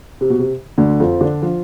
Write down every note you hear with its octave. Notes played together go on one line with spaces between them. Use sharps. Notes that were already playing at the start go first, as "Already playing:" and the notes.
C3
B2
C3
D2 D3
F2 F3
D3 D4
F3 F4